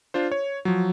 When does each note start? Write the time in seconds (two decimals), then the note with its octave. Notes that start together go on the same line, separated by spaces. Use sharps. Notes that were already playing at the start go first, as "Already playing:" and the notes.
0.14 D4 F4 C5
0.32 C#5
0.65 F3 F#3